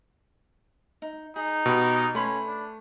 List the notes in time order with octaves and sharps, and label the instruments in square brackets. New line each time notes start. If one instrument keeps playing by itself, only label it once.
[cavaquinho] D#4
[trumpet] D#4 [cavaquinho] G#4
[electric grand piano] B2 [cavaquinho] G4 B4
[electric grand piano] A3 [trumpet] C#4 [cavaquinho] B4 B5 C6
[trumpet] D4